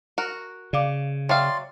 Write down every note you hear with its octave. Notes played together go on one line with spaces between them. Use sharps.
F#4 A#4
C#3 D5 F5 D6
F#3 D5 E5 F5 G5 C6